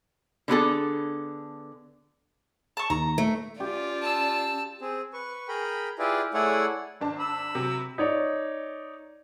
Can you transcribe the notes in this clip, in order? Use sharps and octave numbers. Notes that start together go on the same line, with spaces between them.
D3 B3 G#4 A4
A5 C#6
D#2 A#5
A3
C#4 F4 G4 D5
A5 E6
C4 G#4
B4 C#6
G#4 A#4 G5 B5
E4 F4 G4 G#4 B4 D5
A3 E4 G#4 C#5 D5 F#5
G#1 D4 A5
B5 E6
C3 F#3 C4
D#4 C#5 D5